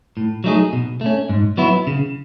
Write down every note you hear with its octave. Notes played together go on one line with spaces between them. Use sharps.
A2
F#3 A3 D#4 G#4
B2
A3 C#4
G#2
F#3 B3 E4
C#3